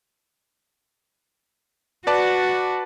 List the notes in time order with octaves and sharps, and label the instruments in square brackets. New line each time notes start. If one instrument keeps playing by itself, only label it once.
[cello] F#4 [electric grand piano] B4 D5 A5